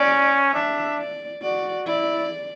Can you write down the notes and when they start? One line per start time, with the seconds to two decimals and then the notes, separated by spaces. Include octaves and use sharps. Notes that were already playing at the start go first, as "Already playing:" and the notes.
Already playing: C#4 D5
0.54 D4 E5
0.98 D5
1.42 F#4 D5
1.87 E4 D5